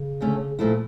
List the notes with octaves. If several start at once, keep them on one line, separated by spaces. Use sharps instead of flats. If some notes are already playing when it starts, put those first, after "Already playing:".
Already playing: C#3
D2 D3 A3 C#4
A#2 F3 A3 E4